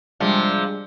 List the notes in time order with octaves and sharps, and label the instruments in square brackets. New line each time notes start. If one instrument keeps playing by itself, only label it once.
[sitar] C3 F3 [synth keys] G3 G#3 D4